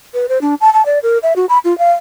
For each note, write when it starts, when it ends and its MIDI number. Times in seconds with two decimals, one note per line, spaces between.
0.14 0.26 71
0.29 0.41 72
0.41 0.55 62
0.61 0.72 81
0.73 0.84 81
0.86 0.99 74
1.03 1.18 70
1.23 1.33 76
1.36 1.46 66
1.49 1.58 83
1.65 1.76 65
1.78 1.92 77